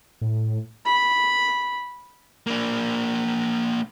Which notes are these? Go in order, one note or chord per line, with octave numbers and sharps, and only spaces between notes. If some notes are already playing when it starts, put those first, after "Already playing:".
A2
B5
A#3 D4